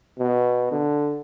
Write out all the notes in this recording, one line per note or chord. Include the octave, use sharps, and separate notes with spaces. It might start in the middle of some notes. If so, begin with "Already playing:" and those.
B2
D3